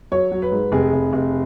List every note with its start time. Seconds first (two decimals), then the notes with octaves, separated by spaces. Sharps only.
0.11 F#3 C#5
0.32 F#3
0.42 B4
0.52 G#2
0.72 F1 G#4
0.92 F1
1.13 F1